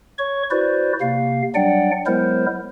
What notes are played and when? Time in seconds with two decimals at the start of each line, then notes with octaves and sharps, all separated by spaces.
0.18 C#5 C#6
0.51 E4 F#4 B4 C5 D5
1.01 C3 A#3 F5
1.55 F#3 G3 D4 D5 F#5 G5
2.06 F#3 G#3 B3 E4 A#4 C5